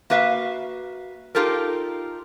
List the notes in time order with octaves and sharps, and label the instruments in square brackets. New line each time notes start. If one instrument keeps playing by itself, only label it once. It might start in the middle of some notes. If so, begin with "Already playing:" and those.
[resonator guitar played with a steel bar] A#3 F#4 B4 E5 F5
D#4 F4 G4 A4 A#4